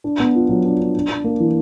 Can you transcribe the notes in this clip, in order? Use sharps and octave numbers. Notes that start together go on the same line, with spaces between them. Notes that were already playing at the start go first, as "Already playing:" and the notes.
D4
B3
F4
F#3
D4
D4
D4
D4
A#3
E3